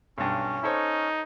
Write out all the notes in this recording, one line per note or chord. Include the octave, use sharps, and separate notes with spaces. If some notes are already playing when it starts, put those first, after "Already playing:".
B1 G2 C#4
D#4 A4 C5 C#5